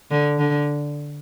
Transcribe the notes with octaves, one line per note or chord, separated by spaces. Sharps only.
D3
D3